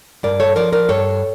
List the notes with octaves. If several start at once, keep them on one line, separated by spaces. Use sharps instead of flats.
G2 A#4 D5
A4 C#5
F3 A#4 D5
A#4 D5
G2 A4 C#5